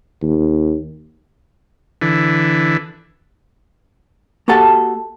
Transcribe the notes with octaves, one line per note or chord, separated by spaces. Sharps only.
D#2
D3 E3
A#3 F#4 G4 A4 F#5 A5